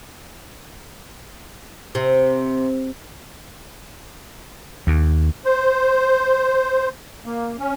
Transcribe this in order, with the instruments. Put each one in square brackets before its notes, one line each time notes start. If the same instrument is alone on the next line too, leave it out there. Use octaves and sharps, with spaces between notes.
[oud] C3
[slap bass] D#2
[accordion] C5
A#3
C#4